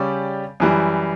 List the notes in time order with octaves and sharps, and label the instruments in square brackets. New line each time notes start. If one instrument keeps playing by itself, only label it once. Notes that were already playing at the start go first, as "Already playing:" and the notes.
Already playing: [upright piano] C#3 G3 C#4 G4 D5
F#2 E3 G3